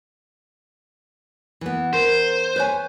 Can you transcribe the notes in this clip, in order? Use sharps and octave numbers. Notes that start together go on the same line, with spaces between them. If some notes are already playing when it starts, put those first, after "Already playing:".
E3 B3
A#4 C5
B4 C#5 G#5